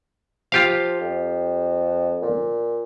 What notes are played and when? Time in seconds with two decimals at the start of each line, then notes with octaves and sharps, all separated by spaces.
0.52 F3 F4 G4 F5
1.01 F2
2.22 A#2